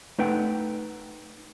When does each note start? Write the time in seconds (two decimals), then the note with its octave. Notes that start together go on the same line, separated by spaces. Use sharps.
0.18 A3 D#4 B4 F#5 G5